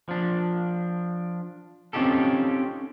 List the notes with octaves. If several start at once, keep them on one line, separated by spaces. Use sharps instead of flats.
F3 D4
C4 C#4 D#4 F4 G4 A4